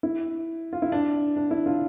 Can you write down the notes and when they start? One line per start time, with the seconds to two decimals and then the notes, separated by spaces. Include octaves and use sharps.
0.03 E4
0.73 F4
0.82 E4
0.92 D4
1.36 D4
1.51 E4
1.66 D4 F4